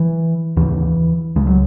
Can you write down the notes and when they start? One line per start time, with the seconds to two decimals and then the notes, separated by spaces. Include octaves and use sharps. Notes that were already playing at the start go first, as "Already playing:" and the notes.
Already playing: E3
0.57 D#2 C#3 E3
1.36 C#2 C#3 G#3
1.47 F#3